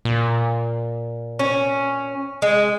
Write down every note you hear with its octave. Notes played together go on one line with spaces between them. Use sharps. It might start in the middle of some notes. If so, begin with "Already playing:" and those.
A#2
C#4
G#3